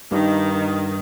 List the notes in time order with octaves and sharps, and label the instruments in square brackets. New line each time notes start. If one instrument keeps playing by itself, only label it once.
[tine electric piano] G2 [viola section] D#3